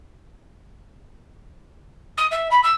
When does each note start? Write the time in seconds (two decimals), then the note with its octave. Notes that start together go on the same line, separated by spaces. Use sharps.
2.17 D#6
2.31 E5
2.51 B5
2.63 E6